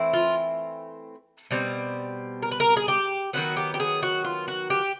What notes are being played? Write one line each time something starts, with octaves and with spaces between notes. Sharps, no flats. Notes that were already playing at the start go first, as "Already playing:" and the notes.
Already playing: E3 A3 C4 E4
F4
B2 G3 C4
A#4
B4
A#4
G#4
G4
D#3 F#3 B3 F#4
G4
G4
G#4
F#4
F4
F#4
G4